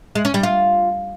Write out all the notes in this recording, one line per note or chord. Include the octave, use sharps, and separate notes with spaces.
G#3
C#4
G3
F4